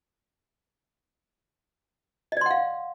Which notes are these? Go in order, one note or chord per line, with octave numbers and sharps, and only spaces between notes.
D5 D#5 F5 F#5 C6